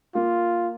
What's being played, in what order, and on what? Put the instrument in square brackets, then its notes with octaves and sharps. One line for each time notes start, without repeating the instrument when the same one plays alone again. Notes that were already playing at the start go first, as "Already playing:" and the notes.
[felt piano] A#3 [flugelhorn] F4